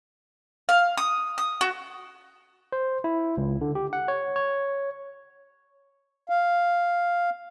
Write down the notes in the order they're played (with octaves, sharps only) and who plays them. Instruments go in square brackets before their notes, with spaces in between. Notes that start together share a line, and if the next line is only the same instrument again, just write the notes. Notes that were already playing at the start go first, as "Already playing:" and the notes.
[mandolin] F5
D#6
D#6
F#4
[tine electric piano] C5
E4
C#2
D3
G4
F#5
C#5
C#5
[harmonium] F5